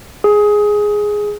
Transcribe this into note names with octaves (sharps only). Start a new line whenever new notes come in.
G#4